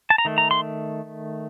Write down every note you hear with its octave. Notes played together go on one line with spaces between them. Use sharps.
A5
A#5
D#3 A3
A#5
C6